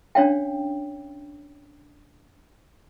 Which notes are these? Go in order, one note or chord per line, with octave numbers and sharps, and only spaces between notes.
C#4 D4 C#5 F5 G5